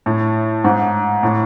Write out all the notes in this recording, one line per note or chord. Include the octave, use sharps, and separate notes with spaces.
A2
G#2
A2